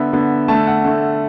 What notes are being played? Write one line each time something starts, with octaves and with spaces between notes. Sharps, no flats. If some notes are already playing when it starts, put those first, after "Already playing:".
Already playing: D3 B3 E5
D3 B3
D3 A3 A5
F#5
D3 A3